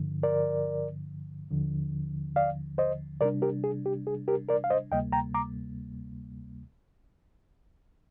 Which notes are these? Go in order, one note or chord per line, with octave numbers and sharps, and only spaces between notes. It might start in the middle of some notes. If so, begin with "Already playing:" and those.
Already playing: G2 D3 F3
A#4 D5
D#2 D3 F3
D5 F5
C5 D#5
C3 G3 D4 A#4 D5
G4 A#4
G#4
G4
G#4
G4 A#4
A#4 D5
F5
C5 D#5
D2 C3 G3 A#3 D#5 G5
G5 A#5
A#5 D6